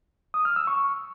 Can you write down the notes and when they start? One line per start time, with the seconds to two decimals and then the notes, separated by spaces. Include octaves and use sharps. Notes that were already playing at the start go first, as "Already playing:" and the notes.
0.34 D#6
0.45 F6
0.56 E6
0.67 C#6